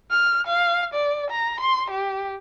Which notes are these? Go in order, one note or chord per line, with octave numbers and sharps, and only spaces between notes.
F6
F5
D5
A#5
C6
G4